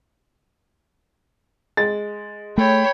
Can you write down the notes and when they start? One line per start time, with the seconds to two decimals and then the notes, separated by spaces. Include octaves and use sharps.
1.77 G#3 A6
2.58 A3 C#5 G5 B5